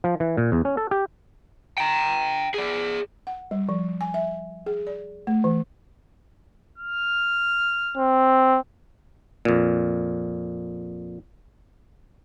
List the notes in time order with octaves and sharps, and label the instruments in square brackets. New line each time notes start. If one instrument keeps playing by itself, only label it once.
[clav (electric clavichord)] F3
E3
A#2
E2
C#4
A4
G4
[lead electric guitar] G5 A#5
G#4 D5
[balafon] F#5
G3
F3
G#5
E5
G#4
D5
A3
E3
[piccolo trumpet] F6
[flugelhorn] C4
[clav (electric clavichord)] F2 A#2